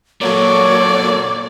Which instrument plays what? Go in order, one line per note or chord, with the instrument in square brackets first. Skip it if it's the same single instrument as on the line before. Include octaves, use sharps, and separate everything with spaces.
[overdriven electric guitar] A#2 F#3 [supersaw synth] A#3 F#4 A4 [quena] C#5 [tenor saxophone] D5